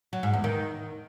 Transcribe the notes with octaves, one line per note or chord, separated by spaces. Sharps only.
F#3
G#2
E2
D#3